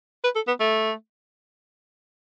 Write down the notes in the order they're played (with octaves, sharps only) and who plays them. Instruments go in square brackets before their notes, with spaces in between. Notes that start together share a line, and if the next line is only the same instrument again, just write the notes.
[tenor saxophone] B4
A4
B3
A3